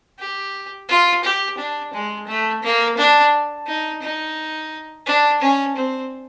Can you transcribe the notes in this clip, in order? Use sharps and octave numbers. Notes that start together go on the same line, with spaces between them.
G4
F4
G4
D4
G#3
A3
A#3
D4
D#4
D#4
D4
C#4
C4